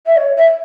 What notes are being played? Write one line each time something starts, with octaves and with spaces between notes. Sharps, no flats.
E5
C#5
E5